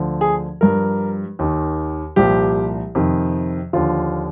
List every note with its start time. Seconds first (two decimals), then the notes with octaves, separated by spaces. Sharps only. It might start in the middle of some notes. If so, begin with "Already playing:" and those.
Already playing: D2 D3 F3
0.21 G#4
0.61 G2 F3 A#4
1.39 D#2 D#3
2.16 C2 A#2 F3 G4
2.95 F2 C3 D#3
3.73 D#2 D3 F3 F4